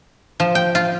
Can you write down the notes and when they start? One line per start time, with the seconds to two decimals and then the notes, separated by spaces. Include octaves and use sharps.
0.40 F3
0.55 G5
0.75 F4